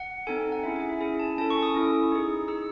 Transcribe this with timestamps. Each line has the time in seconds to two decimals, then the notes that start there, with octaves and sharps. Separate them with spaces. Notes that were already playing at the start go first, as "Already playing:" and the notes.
Already playing: F#5
0.27 C4 D#4 A4 G#5
0.39 G#5
0.52 F#5
0.63 C#4 E4 G#4 E5
0.76 G#5
0.89 E5
1.01 C#4 E4 G#4 G#5
1.19 A5
1.38 C#4 E4 A4 A5
1.50 C#6
1.63 D#6
1.75 C#4 E4 A4
2.12 D#4 G#4
2.48 D#4 G#4 E6